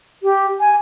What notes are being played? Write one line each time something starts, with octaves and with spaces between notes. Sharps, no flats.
G4
G#5